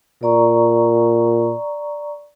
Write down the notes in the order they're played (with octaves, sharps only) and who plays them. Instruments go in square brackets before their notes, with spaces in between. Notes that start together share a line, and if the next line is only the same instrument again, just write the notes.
[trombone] A#2 [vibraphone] D5 A#5 C#6